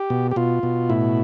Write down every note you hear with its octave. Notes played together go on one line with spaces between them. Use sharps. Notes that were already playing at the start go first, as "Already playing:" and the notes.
Already playing: G4
B2
G4
B2 F4
B2
A2 E4